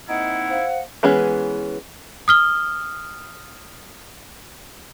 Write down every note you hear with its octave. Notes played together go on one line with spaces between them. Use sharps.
A#3 C4 D#4 E4 F#5
C5 F5
E3 G#3 B3 C#4 G#4
D#6 F6 G7